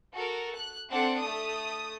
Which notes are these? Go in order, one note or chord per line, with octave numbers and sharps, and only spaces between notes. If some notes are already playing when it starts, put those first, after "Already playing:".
F#4 A4 A#4
F#6
C4 D4 A4 F#5
A3 D#6